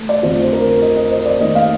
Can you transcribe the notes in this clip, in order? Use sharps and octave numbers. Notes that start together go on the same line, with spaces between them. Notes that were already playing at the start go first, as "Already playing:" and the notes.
Already playing: A3
D5
F2 D3 F3 A3 C5
C5
A#4
D#5
D#5
C5
D5
D#2 D#3 A3 D#5
F5